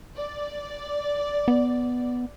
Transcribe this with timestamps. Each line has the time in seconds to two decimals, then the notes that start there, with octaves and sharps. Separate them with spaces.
0.17 D5
1.48 B3